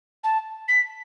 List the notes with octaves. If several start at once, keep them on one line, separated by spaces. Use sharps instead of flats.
A5
B6